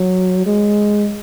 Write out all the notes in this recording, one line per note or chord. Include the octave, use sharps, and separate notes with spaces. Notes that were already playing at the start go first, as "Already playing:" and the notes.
Already playing: F#3
G#3